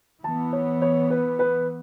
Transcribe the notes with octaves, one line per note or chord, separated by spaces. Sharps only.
E3 B3 A5
C#5
C#5
B4
B4